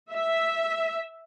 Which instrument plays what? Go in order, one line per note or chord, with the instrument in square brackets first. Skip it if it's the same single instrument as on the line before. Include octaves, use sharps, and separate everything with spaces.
[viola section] E5